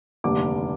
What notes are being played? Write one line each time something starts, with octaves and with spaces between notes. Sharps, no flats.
F1 D#2 D3 G3 D6